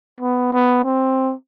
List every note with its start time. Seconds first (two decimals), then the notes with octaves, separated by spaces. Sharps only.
0.20 B3
0.53 B3
0.84 C4